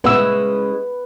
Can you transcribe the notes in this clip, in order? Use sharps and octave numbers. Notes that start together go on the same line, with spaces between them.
A#2 C#3 G#3 B3 E4 B4 E6